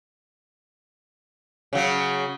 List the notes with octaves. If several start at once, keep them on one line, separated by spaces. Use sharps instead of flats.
C#3 F#3